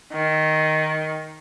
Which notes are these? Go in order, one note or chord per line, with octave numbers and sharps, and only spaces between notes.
D#3